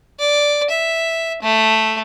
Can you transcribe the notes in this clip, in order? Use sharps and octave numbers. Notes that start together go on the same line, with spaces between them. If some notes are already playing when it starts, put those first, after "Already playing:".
D5
E5
A3